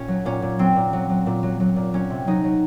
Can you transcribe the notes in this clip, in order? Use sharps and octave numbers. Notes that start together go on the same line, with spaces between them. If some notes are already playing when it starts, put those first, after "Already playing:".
Already playing: A#2 C#4
F#3
A#2 C#4
A#2
F#3 C4
A#2
F#3
F#3
A#2
F#3
F#3
A#2
F#3 C#4
C3
F#3 D#4
F#3